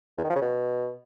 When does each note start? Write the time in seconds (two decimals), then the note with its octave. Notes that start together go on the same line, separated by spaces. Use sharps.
0.18 E2
0.24 D#3
0.30 F3
0.36 C#3
0.41 B2